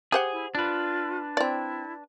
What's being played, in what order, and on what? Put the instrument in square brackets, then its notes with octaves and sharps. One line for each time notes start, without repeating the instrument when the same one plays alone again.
[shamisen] G4 C5 F#5 [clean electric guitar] G#4
[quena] E4
[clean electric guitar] D4 B4 [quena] F4
[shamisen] C4 D5 [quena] E4